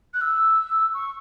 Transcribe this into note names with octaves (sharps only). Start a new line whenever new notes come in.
F#6
E6
C#6